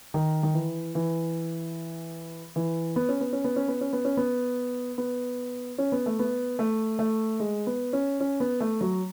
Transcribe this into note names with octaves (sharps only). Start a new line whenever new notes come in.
D#3
D#3
E3
E3
E3
B3
C#4
B3
C#4
B3
C#4
B3
C#4
B3
C#4
B3
B3
C#4
B3
A3
B3
A3
A3
G#3
B3
C#4
C#4
B3
A3
F#3